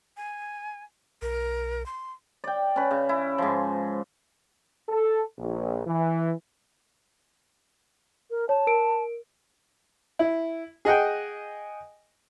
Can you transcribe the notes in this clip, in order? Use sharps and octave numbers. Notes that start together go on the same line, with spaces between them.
G#5
B1 A#4
C6
D5 G5
C#4 B4
C#3
E4
G#2 F3
A4
A#1
E3
A#4
C#5 A5
A#4 D7
E4
G#4 D#5 F#5 G5